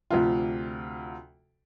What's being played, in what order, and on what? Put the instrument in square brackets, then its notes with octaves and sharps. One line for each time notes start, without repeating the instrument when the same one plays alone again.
[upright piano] D2 C3 F3 F4